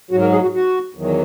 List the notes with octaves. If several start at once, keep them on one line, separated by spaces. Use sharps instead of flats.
G#2 F#3 F#4
A#4
G#4
F#4
F#4
E2 D#3 F#3